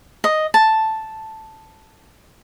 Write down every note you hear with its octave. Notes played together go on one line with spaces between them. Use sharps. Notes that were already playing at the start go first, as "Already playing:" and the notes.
D#5
A5